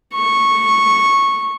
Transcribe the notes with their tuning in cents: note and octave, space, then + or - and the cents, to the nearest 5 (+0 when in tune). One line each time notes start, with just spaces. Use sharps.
C#6 -10